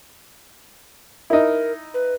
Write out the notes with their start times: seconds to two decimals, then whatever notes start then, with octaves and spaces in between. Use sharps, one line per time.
1.30 D#4 E4 A#4
1.94 B4